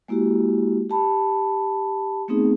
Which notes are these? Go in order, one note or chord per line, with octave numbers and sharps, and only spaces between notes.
G#3 A#3 E4 F#4 G4
G4 A5 B5
A3 B3 C4 D#4 G#4